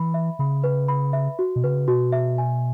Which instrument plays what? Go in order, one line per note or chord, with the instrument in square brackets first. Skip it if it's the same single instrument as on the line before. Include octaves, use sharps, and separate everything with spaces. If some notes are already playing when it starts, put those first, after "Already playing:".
Already playing: [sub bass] E3 [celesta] B5
[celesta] E5
[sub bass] C#3 [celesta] B5
[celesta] B4
B5
E5
F#4
[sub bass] B2
[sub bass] C#3 [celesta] B4
[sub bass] B2 [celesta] F#4
[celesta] E5
G#5